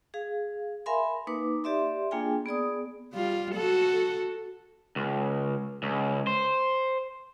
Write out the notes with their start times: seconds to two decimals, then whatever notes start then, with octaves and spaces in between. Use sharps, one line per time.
0.14 G#4 F5
0.86 A#4 E5 F5 G#5 B5 C6
1.27 A#3 D#4 B4 D6
1.64 G4 D5 E5 C6
2.11 A#3 D4 F4 G#4 G5 G#5
2.46 B3 G#4 D5 D#6
3.14 G3 F4
3.55 F#4 A4
4.96 C#2
5.83 C#2
6.27 C5